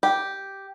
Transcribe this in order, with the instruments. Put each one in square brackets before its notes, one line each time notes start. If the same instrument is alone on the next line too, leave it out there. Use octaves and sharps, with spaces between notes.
[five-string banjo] G4